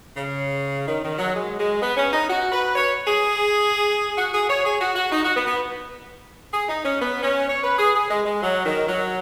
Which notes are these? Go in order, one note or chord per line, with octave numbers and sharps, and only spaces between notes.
C#3
D#3
D#3
F#3
G#3
G#3
B3
C#4
D#4
F#4
B4
C#5
G#4
F#4
G#4
C#5
G#4
F#4
F#4
D#4
F#4
B3
B3
G#4
D#4
C#4
B3
C#4
C#5
B4
G#4
G#4
G#3
G#3
F#3
D#3
F#3